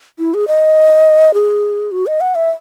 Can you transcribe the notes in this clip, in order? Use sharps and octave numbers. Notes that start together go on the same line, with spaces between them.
E4
G#4
D#5
G#4
F#4
D#5
F#5
E5